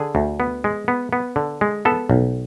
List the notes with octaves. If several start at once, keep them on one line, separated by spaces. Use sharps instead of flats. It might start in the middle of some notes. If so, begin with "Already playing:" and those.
Already playing: D3 G#4
D2
B3
G#3
B3
B3
D3
G#3
B3 A4
B1